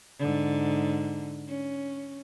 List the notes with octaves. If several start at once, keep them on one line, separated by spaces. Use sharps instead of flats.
G#2 D3
C#4